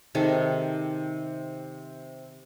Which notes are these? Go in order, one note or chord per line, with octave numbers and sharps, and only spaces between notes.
C3 D#3 G#4 A4